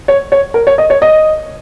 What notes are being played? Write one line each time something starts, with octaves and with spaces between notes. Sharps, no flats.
C#5
C#5
A#4
C#5
D#5
C#5
D#5